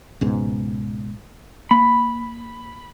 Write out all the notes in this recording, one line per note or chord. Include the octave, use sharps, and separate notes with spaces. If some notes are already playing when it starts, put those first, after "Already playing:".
C#2 G#2 B2
A#3 B5